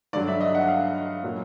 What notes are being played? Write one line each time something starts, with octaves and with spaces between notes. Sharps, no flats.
G2 D3 F#3 D5
E5
D#5
F#5
F5
A#2 F#3